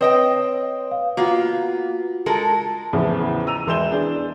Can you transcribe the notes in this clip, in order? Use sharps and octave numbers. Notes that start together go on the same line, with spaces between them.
C4 B4 C#5 D#5 G5 D#6
F5
A#3 B3 F4 F#4 F5
G#3 A4 A#4
E2 A2 C#3 F3 B3
A#5 E6 D#7 F7
E1 E3 C6 G6 E7 G7
B3 D4 G#4